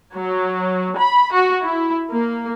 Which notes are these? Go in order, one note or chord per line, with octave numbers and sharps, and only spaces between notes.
F#3
B5
F#4
E4
A#3